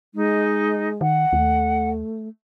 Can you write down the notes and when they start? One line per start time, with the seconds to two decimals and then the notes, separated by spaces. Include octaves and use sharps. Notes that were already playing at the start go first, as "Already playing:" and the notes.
0.14 G#3 D#4
1.01 D#3 F#5
1.33 D#2 A3